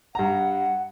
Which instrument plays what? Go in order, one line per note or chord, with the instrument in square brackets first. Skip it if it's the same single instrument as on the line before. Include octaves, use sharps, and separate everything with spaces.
[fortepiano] G2 A#5 [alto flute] F#5